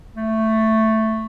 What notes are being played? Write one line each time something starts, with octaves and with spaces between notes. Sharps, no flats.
A3